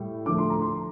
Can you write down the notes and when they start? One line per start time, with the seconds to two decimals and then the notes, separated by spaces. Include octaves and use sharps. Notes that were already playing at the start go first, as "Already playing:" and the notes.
Already playing: A2 G3
0.26 D3 F3 A3 D6
0.38 C6
0.50 A#5
0.62 C6